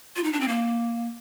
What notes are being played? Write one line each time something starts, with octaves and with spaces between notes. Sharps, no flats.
F4
D#4
D4
C4
A#3